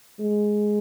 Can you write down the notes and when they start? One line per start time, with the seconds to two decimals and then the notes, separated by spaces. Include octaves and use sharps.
0.20 G#3